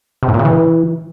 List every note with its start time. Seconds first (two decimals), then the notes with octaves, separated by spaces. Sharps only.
0.23 C3
0.28 A2
0.34 A#2
0.39 C#3
0.45 E3